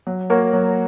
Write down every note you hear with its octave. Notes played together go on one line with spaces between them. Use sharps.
F#3
A#3 F#4 A#4 C#5
F#3